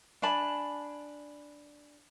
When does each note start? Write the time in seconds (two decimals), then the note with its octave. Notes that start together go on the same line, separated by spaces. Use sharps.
0.22 D4 G#5 A5 B5